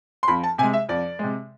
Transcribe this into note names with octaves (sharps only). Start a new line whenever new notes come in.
C6
F2 B5
A5
C3 G#5
G#3
E5
F2 D5
C3 G#3